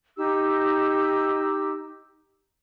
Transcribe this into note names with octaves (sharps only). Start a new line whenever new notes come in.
D#4 G4 E6